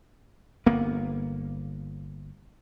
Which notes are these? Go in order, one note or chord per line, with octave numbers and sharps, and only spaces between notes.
G1 A#3 B3